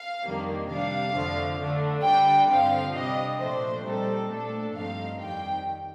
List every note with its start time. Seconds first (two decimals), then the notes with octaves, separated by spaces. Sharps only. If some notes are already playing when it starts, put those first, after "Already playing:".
Already playing: F5
0.24 F2 D#3 G3 A#3 D4
0.70 C3 G3 D4 F5
1.14 F2 D3 F3 A3
1.60 D3 A3 D4
2.04 D3 G3 D4 G5
2.49 G2 D3 F3 C4 F5
2.94 C3 G3 D4 D#5
3.40 A#2 F3 A3 D4 C5
3.85 A#2 G3 C4 D#4 A4
4.29 A#2 A3 D4 A4
4.74 G2 F3 A3 C4 D#4 F5
5.20 F2 D#3 G3 G5